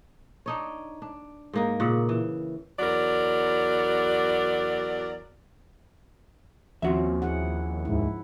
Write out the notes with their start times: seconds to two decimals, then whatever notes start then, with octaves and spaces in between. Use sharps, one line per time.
0.46 D4 D#4 C#5
1.02 D4
1.53 G#2 A#3 D#4
1.80 A#2 C#3 F#5
2.09 E3
2.79 E2 F#3 A#4 D5
6.82 D#2 F3 C4 C#4 F#4 E5
7.22 E4 G#4 F#5
7.85 C#2 G#2 E4